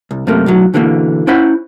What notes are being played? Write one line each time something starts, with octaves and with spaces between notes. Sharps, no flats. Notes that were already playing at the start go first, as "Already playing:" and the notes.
C2
F#2 C3 A3 A#3
B1 A2 F#3
B2 D3 E3 F3 A#3
C#4 E4 C5 F#5 B5